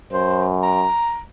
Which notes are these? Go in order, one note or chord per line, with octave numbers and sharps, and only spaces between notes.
F#2 C5
A#5